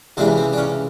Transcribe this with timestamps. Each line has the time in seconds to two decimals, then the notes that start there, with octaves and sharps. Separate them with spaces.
0.17 C#2 C3 E3 C4 D4
0.37 C4
0.53 D4
0.57 C#4